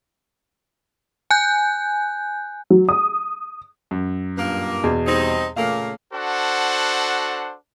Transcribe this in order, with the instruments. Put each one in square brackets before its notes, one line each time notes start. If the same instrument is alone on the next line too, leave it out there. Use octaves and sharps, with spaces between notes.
[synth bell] G#5 F#6 G6
[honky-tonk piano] F#3
D#6
[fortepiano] F#2
[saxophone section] G2 A#2 A#3
[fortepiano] E2 B2
[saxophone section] G3 C4 D#4
[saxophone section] A#2 C#3 A#3 [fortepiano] A3 F5
[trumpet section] D4 F#4 A4 C5 F#5